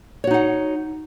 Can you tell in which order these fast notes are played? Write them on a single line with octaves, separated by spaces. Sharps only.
C#5 F#4 D#4 F#5